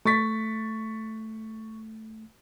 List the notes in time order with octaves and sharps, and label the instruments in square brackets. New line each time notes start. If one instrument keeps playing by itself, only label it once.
[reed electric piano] A3 [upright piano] C#6 A6 B6